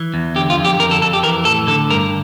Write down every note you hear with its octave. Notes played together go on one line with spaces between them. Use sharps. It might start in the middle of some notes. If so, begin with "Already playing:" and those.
Already playing: E3
E2
D3 G4
F4
F2
G4
F2 A#4
A4
F2 A4
G4
E3 A#4
A2 A4
D3 A4
G2 A#4